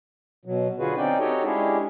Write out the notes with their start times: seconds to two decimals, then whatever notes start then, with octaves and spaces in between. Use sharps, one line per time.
0.45 B2 F#3
0.79 D3 F4 F#4 G#4 B4
0.97 C4 C#4 D#4 D5 G5
1.20 D#4 F#4 G4 A4 C#5 D#5
1.44 G#3 C#4 D4 E4 G4 G#4